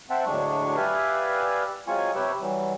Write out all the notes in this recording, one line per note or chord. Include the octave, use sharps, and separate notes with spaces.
C4 C5 E5 F#5 G5 A5
D2 A2 F#3 G#3 D4 C#6
G4 B4 D5 E5 F5 G#5
F#3 G#3 C4 F4 G#5 C#6
C3 G4 B4 C#5 G5 E6
E3 F#3 G3